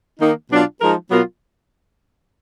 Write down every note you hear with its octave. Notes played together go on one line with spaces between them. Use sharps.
D#3 A#3 D#4
B2 F#3 D4 F4
F3 G#3 D#4 A#4
B2 F#3 B3 F4 A#4